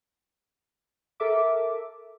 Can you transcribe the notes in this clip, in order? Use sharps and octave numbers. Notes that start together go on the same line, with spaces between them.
A4 A#4 E5 D6